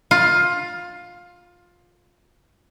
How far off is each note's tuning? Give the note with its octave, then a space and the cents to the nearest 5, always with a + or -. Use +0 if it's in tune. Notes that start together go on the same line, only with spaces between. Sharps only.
F4 +15